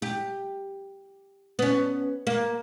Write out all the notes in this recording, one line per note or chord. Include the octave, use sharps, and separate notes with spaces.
G4
B3 C#4
A#3